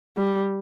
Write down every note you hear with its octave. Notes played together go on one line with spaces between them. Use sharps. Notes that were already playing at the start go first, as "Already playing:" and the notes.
G3